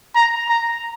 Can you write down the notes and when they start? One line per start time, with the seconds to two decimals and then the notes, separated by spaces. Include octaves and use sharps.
0.15 A#5
0.48 A#5